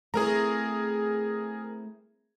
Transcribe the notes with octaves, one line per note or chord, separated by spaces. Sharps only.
A3 C4 E4 G#4 A#4 A#5